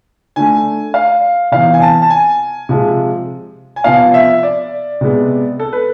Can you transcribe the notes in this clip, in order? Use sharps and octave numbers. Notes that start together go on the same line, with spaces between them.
D3 A3 G#5
F5
C3 E3 B3 F5
G#5
A5
A5
G#5
C3 F3 G#3
G#5
C3 F3 B3 F5
E5
D5
C3 G#3 B3
A4
B4